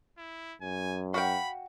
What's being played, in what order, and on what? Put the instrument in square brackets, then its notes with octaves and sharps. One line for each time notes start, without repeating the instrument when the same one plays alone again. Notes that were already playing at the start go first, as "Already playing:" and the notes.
[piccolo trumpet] E4
[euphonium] F#2 [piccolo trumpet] G#5
[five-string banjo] F#4 F5 G5 [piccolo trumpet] B5